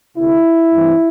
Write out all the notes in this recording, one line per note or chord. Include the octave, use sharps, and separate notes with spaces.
D2 C3 A3 E4
G2 E3 A3 C4